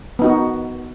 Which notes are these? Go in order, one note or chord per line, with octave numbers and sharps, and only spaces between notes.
B3 D#4 F#4